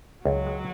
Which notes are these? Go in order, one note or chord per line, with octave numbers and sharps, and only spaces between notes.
C#2 F#3
G#3